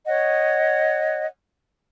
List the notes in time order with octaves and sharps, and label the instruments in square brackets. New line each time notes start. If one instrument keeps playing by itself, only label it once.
[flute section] C#5 D#5 F#5